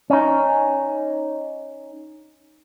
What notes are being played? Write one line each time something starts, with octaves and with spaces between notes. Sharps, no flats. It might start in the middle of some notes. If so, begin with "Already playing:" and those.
C#4 D#4